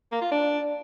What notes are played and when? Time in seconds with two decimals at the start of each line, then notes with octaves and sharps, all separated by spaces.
0.12 A#3
0.22 F4
0.32 D4